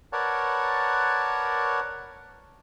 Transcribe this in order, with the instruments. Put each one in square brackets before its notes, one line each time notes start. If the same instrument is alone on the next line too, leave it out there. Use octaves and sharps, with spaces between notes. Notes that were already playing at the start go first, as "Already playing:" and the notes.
[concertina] A#4 B4 C#5 D5 F#5 A5